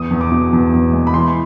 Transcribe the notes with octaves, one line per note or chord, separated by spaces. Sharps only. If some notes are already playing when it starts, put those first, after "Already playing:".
Already playing: E2 D#6
E2
D6
B2
E2
E2
G#3
B5
E3 C6